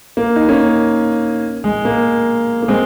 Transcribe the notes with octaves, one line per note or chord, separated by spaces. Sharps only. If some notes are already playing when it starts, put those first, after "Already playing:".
A#3
D#4
A#3 C#4
G#3
A#3
A#3
G#3 C4